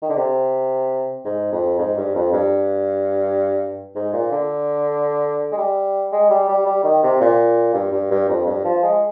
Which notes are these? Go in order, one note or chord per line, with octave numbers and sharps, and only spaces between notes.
D#3
D3
C3
G#2
F2
G#2
G2
F2
G2
G#2
A#2
D3
G#3
G3
G#3
G3
G3
G3
D#3
C3
A#2
G2
G2
G2
F2
G2
F3
G#3